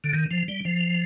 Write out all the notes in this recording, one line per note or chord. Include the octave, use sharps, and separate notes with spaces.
D3
D#3
F3
G3
F3